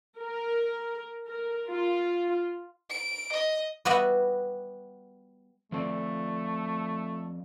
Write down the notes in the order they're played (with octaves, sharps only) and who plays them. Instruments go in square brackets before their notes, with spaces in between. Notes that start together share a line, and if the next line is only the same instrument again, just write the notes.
[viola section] A#4
A#4
F4
[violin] D7
D#5
[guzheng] G3 B3 F#4 D#5 E5 F#5
[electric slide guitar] F3 C4 D5 [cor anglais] A3